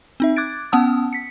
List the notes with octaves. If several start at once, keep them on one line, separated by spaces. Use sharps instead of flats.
C4 D#4 E5
D6 F#6 G#6 A6 D7
B3 C#4 F#5 A5 D#6 E6
B6 C#7